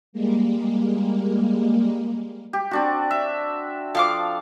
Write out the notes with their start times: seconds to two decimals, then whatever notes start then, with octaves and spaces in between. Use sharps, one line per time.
0.13 G3 G#3 A#3
2.53 G4
2.71 C4 D4 F#4
3.11 E5
3.95 F3 A4 F5 D6